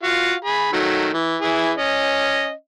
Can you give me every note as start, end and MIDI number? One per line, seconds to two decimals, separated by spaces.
0.03 0.33 65
0.03 0.33 66
0.03 0.33 77
0.44 0.71 68
0.44 0.71 83
0.73 1.09 51
0.73 1.09 54
0.73 1.09 57
1.13 1.36 52
1.41 1.71 52
1.41 1.71 64
1.41 1.71 68
1.77 2.51 61
1.77 2.51 75